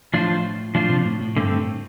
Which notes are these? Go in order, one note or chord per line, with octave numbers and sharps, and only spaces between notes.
A2 F3 D4 F4 C5
A2 F3 D4 F4 C5
C3
A2
A2
G2 D3 A3 C4
A2